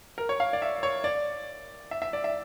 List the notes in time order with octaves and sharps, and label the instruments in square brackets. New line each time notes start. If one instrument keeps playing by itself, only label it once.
[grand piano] A#4
C#5
F5
D5
E5
C#5
D5
E5
E5
D5
E5